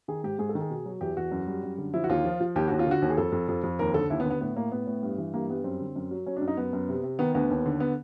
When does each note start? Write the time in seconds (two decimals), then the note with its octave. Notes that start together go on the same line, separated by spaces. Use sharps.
0.08 D#3 G#4
0.23 G#2 G4
0.39 G#2 G#4
0.49 A4
0.55 D#3
0.61 G#4
0.70 B2
0.86 F#3
1.01 E2 G4
1.17 E2 F#4
1.32 F#2
1.47 G3
1.63 F#2
1.78 D3
1.94 F3 E4
2.04 F#4
2.09 D#2 F4
2.25 F3
2.41 F3
2.56 D#2 G4
2.68 D#2 F#4
2.79 F4
2.87 D3 F#4
3.02 D#2
3.10 G#4
3.18 F2 A4
3.32 F2
3.48 F2
3.64 F2
3.79 D#2 A#4
3.94 D3 A4
4.10 D#2 E4
4.20 B3
4.25 D3
4.30 B3
4.41 A2 B3
4.56 A2 A#3
4.72 A2 B3
4.87 A2
5.03 G2
5.18 E3
5.34 G2 A#3
5.49 G3 B3
5.64 F#2 C4
5.80 D3
5.96 F#2
6.11 F#3
6.26 F#3 C#4
6.37 D4
6.41 F#2
6.48 D#4
6.57 F#2 B3
6.73 F#2
6.89 C3
7.03 C3
7.19 D#3 B3
7.35 D2 B3
7.50 D#2
7.66 D3
7.80 B3